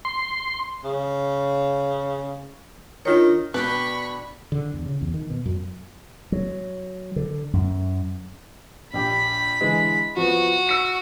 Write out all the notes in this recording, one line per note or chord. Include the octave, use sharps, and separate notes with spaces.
C6
C#3
D#3 D4 F4 C#5
B2 D4 B4 D5 G5 B5 C#6
D3
E2
C#3
E2
D#3
B2
F#2
F#3
D3
F#2
A#1 G4 B5
D3 E3 G#3
F3 B3 F#4
E6 C#7 E7